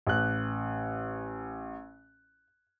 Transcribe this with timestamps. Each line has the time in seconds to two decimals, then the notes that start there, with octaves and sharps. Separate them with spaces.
0.07 A1 F#6